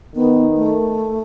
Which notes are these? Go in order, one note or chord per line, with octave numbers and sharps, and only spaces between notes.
D#3 B3
A3